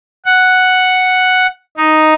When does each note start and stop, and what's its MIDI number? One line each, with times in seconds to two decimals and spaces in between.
0.26 1.47 78
1.77 2.14 63